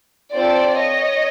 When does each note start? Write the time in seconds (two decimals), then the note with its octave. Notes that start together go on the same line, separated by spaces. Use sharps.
0.34 C4 F4 A4 C5 D5
0.79 C#5 D#5